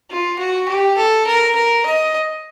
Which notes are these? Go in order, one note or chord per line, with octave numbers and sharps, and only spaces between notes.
F4
F#4
G4
A4
A#4
A#4
D#5